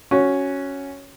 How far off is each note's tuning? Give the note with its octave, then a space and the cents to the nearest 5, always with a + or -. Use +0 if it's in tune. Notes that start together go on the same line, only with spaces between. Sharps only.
C#4 +0 F#4 +0